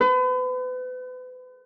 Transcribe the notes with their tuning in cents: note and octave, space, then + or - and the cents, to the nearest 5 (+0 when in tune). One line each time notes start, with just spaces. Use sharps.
B4 +40